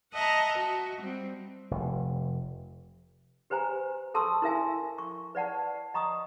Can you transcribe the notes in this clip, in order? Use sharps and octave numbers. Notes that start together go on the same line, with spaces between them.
D#5 E5 F#5 A5 A#5
F#4
G3 C4
F1
G4 B4 C5 G#5 A#5
A4 A5 C6 C#6 E6
E4 A#4 E5 G#5
C#6
B4 D5 F#5 A5
D#5 A#5 C#6 D#6